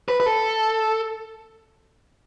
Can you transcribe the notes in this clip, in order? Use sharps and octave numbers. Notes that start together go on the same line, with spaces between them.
B4
B4
A4